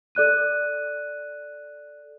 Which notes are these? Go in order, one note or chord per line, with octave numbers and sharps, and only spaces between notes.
A4 D5 F#6 D#7